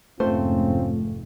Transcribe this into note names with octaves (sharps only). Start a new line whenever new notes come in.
F1 G#2 A3 C4 C#4 F4 C5